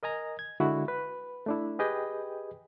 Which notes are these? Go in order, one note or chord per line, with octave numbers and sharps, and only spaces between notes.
A#4 D#5 G#5 A#5
G#6
D3 G#3 E4 F#4 G#4
B4
A3 D4 E4
G4 G#4 B4 D#5 G5 G#5